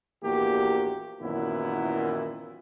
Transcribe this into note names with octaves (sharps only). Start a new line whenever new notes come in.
A#1 E2 A#3 F#4 G4
F#2 A#2 D#3 E3 B3 E4